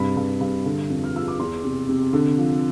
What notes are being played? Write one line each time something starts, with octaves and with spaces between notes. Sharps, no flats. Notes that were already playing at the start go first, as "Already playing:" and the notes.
Already playing: G2 C3 B5
G2
G2
D3
F2
F6
F3 E6
D6
E2 C6
C3
C3
D3
F3